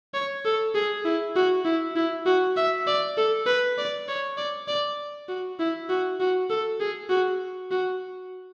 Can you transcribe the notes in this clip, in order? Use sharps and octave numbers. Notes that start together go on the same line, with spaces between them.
C#5
A4
G#4
E4
F#4
E4
E4
F#4
E5
D5
A4
B4
D5
C#5
D5
D5
F#4
E4
F#4
F#4
A4
G#4
F#4
F#4